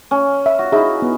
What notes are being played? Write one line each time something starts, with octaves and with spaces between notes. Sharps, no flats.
C#4
E5
F#4
D#4 E4 G#4 E5
B3